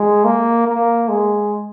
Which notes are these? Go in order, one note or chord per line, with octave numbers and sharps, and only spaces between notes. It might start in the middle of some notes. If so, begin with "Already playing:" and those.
Already playing: G#3
A#3
A#3
G#3